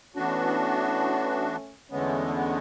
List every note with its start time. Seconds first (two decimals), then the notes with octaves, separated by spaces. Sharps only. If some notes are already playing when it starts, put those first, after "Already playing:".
0.15 E3 A3 B3 C#4 D4 F#4
1.91 E2 D3 G#3 A3 B3 C#4